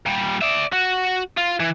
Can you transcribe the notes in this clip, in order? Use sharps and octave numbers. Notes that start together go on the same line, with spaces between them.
A#2 G3
D5 E5
F#4
F4
E3